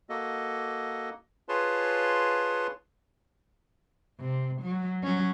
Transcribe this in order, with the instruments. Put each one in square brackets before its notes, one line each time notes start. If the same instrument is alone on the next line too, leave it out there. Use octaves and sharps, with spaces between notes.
[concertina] A#3 F#4 A4 D#5
F4 G#4 B4 C#5 A5 C6
[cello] C3
F#3
F#3 C#4